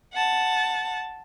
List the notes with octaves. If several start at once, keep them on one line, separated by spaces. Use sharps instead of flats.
F#5 A5